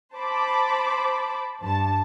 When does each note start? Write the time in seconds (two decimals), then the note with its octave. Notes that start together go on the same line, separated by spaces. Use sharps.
0.15 C5 A5 B5 D6
1.61 G2 A5